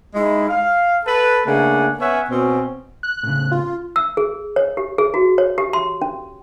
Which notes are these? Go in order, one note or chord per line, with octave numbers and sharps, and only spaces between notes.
G#3 D#4 E4
F5
A4 B4 A5
C#3 A3 A#3 D4 F#5 G#5
B3 C#4 C#5 E5 F#5 G#5
B2 C4 C#4
F#6
A2 C#3
F4
E6
G#4
C#5
G4
G#4
F#4
C#5
G4
C6
C#4